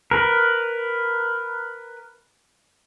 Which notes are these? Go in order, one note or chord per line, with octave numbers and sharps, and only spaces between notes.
A#4 B4